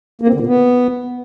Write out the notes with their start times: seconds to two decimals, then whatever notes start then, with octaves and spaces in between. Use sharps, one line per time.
0.21 A#3
0.28 C4
0.34 D3
0.40 A#2
0.46 B3